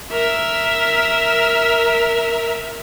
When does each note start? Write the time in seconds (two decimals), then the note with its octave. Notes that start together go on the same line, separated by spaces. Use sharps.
0.11 A#4 E5